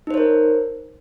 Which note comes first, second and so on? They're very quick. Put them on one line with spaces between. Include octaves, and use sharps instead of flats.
D#4 C5 C#5 A#4